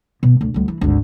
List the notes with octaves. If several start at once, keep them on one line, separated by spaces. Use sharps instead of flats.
B2
D2
D2 G3
E3
G#1 D2